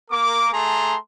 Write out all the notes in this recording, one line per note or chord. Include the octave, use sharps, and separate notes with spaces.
A#3 A#4 D6
A3 G#4 A5 A#5 C6